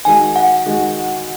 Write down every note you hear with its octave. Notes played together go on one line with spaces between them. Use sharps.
D#3 G#3 F#4 G#5
F#5
D#3 G#3 F#4